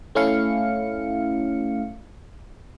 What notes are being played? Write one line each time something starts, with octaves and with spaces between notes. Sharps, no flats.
A3 C#4 E4 F5 C#7